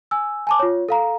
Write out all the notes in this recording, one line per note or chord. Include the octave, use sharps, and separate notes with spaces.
G#5 E6
G#5 A5 D6
F4 C#5
A4 F5 A#5